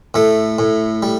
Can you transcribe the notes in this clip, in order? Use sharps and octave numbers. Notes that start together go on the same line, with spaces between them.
A2 A3
A2
G3